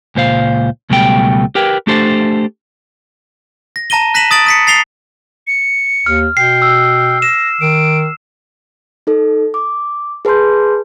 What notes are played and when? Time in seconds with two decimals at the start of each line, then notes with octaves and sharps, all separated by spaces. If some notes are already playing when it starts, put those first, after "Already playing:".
0.15 C#2 A#2 C5 F5
0.90 C#2 B2 F#3 G3 A3 G5
1.55 G4 A#4 B4 G5
1.87 A3 D4 G4 A4 C5
3.76 A#6
3.90 A5 A#5 A#6 D#7 G7
4.14 F#6 A#6 B6 D#7 E7 F#7
4.31 D#6 A6 D7 F#7
4.47 D#6 B6 C#7
4.67 A6 C7 F7 G7
5.47 C#7
6.06 D#2 F6
6.37 B2 G5 C7
6.62 E6
7.22 A#6 E7
7.61 D#3 D7
9.07 D#4 A4
9.54 D6
10.25 G#4 B4 A5 C6 G6